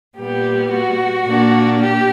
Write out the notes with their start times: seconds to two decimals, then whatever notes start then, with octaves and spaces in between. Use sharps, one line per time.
0.18 A#2 G3 B3 G4
0.72 F#4
1.26 A#2 A#3 D4
1.79 G4